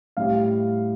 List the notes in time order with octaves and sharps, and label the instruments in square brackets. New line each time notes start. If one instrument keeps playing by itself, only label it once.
[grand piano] A2 G3 F5